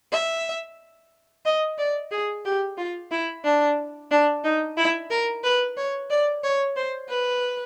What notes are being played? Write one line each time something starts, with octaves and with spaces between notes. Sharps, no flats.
E5
D#5
D5
G#4
G4
F4
E4
D4
D4
D#4
E4
A#4
B4
C#5
D5
C#5
C5
B4